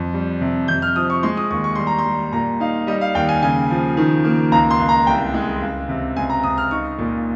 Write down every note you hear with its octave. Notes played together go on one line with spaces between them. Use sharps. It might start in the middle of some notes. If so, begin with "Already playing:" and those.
Already playing: F2
G3
C3
F2 G6
F6
F3 D#6
C#6
G#3 C6
D#6
D#2 C#6
C#6
G3 C6
A#5
C6
G3
A#2 A#5
D#4 F5
G3 D#5
F5
D#2 G5
G#5
C#3 G#5
F3
D#3
A#3
C#2 A#5
C6
C#2
A#5
C2 G5
G#3
C#2
C3
C#2 G#5
A#5
C#2 D#6
F6
D#4 C#6
A#2